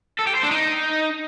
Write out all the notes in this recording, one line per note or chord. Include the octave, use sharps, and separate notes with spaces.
A4
G4
C5
D4
D#4